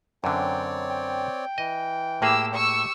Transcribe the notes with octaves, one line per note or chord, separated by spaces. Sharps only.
F#2 D3 C4 C#5 D5 G5
G5
E3 D#5
A2 A#3 G4 G#4 E6
G4 C#6 E6